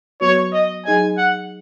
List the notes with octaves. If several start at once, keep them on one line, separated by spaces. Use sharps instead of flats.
F#3 B3 F#4 B4 C#5
D#5
F#3 D#4 G#4 D#5 G#5
F#5